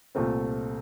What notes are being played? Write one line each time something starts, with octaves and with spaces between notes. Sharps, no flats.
C2 A#2 A3 C4